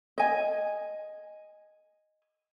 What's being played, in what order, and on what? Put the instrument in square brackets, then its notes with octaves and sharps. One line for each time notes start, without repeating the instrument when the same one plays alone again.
[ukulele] D#5 G#5